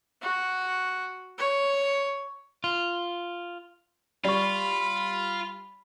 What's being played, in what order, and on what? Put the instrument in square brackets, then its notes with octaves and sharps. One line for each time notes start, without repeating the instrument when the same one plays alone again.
[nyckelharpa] F#4
C#5
[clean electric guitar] F4
[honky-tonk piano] G3 [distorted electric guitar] F4 [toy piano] D5 C#6 [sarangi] B5